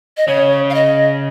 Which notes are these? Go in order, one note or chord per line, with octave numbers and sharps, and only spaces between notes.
D#5
C#3 C#5
F5
D#5